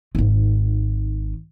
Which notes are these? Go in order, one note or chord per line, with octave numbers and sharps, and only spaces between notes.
G#1 D#3